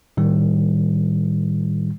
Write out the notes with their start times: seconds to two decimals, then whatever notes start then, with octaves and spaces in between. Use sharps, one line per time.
0.17 A2 D#3 G3